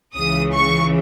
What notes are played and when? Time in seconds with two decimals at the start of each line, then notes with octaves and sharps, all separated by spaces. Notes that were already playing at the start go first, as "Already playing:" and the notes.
0.14 C#2 C#3 E3 D#6
0.53 C#6